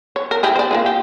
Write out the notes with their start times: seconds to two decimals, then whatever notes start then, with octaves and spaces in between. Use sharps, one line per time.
0.16 C#5
0.31 A#4
0.43 E4 G4 G#4
0.55 C5 D5
0.71 A#3 F4 G#4
0.86 G4